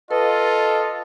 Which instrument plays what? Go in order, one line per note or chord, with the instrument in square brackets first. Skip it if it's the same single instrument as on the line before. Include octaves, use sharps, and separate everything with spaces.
[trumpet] F4 [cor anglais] A4 [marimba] B4 [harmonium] D#5